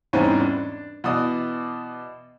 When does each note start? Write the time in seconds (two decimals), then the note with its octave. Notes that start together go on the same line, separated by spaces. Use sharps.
0.13 E2 G#2 G3 C4 C#4
0.41 D4
1.04 B2 E3 D5 D#6